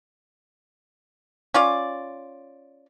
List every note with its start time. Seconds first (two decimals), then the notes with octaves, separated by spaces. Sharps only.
1.54 C#4 F4 D5